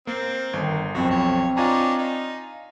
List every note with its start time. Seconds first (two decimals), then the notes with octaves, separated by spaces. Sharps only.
0.07 A#3 C4
0.53 G1 D#3
0.95 B1 F2 C4 F#4
1.11 C#5
1.57 D4 D#4 F4 C#5 G#5 A#5
1.98 D#4